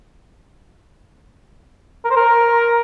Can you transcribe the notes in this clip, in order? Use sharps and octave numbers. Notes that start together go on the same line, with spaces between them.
A#4
C5
A#4